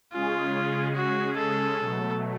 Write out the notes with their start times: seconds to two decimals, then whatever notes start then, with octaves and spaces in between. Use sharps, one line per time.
0.13 C#3 G#3 C#4 F4 G#4
0.96 F#4
1.37 A4
1.79 B2 F#3 A3